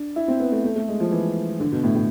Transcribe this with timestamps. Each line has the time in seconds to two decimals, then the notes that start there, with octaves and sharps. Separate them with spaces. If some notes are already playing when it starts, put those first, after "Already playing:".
Already playing: D4
0.16 E4
0.28 C4
0.40 B3
0.52 A3
0.64 A3
0.76 A3
0.88 G#3
1.00 F3
1.12 E3
1.60 D3
1.72 B2
1.84 A2
1.95 A2